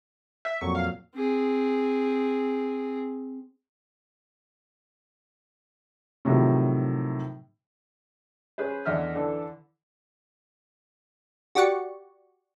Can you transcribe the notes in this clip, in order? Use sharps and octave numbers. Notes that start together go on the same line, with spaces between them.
E5
F2 A#2 F#3 C#6
F5
C4 G#4
A2 C3 D#3 F3 F#3
C#4 G#4 B4 C5
E2 D3 D#5 E5 F6
D3 E3 A4
F#4 G4 D5 F#5 C#6